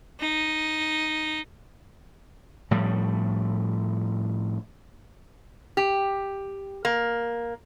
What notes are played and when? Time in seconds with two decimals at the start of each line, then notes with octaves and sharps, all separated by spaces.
0.20 D#4
2.71 A2 F3 G3
5.77 G4
6.85 A#3